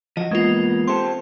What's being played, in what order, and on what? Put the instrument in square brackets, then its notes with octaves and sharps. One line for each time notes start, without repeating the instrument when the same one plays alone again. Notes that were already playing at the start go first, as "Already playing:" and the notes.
[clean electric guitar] F3 F#3 F#4 [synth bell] D#5
[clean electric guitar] E2 A#3 B3 [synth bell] G#3 F4
[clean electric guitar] C4 G4 A4 [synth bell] C6